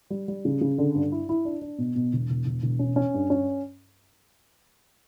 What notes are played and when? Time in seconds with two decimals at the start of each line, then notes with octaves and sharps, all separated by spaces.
0.10 G3
0.28 G3
0.45 C#3
0.61 C#3
0.78 D3
0.95 G2
1.12 E4
1.29 E4
1.45 D4
1.62 D4
1.78 B2
1.95 B2
2.13 E1
2.30 E1
2.46 E1
2.62 E1
2.79 C#4
2.96 C#4
3.14 G2
3.30 C#4